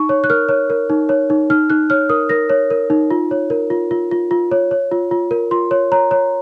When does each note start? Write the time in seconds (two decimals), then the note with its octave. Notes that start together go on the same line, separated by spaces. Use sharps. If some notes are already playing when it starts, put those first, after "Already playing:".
Already playing: D#4 C#6
0.09 C#5
0.24 F#6
0.30 A#4 F6
0.49 C#5
0.70 A#4
0.90 D#4
1.09 C#5
1.30 D#4
1.50 D#4 F6
1.70 D#4 F#6
1.90 C#5 F6
2.09 A#4 D#6
2.29 A#4 A#6
2.50 C#5
2.70 A#4
2.90 D#4
3.11 F4
3.31 C#5
3.50 A#4
3.70 F4
3.91 F4
4.11 F4
4.31 F4
4.51 C#5
4.71 C#5
4.92 F4
5.11 F4
5.31 A#4
5.51 F4 C6
5.71 C#5
5.92 C#5 A#5
6.11 C#5